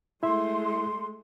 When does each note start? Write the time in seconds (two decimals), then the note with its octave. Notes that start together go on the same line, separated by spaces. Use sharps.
0.23 G#3 A3 E4 E5 C6